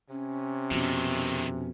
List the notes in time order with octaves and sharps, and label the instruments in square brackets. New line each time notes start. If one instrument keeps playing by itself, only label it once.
[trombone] C3 [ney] C#4
[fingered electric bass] F2 B2 [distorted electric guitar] D#3 E3